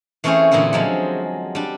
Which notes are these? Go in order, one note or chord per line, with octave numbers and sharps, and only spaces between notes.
E3 A3 C4 C#4 G#4 C5
A#2 D3 E3 E4 G#4
F3 F#3 G#3
G3 D4